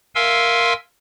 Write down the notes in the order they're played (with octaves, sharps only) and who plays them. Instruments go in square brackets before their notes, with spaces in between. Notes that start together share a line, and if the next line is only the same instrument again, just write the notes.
[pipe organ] A#4 E5 F5 G#5 C6 E6